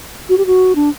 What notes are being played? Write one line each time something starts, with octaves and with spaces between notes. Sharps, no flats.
F#4
G4
F#4
D4